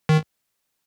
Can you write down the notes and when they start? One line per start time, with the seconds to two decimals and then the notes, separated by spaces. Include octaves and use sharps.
0.09 D#3